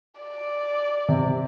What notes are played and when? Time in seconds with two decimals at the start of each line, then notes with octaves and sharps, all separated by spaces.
0.20 D5
1.09 C3